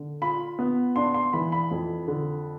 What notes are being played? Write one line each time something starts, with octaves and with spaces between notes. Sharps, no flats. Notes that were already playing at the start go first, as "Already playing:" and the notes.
Already playing: D3
F4 B5
B3
D4 C6
C6
E3 B5
B5
F2
D3